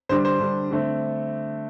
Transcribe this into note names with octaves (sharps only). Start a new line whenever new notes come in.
D3 G3 D4 C5
C5
D3 G3 D4
D3 A3 C4